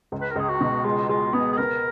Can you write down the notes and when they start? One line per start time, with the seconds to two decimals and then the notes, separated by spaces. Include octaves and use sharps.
0.12 C#2
0.21 B4
0.31 A#4
0.36 C#2 G#4
0.49 F#4
0.61 B2
0.85 G#3 F4
1.09 G#3 F4
1.33 B3 G#4
1.52 G#4
1.58 B3 A#4